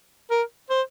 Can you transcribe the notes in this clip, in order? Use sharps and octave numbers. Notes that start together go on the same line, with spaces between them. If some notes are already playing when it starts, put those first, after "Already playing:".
A#4
C5